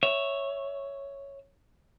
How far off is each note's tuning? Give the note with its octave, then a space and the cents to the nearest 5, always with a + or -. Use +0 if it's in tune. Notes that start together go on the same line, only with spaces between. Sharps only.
C#5 +0 E5 +0